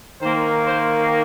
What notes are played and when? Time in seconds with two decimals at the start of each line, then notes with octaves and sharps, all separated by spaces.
0.21 D#3 A#3 C5
0.66 C5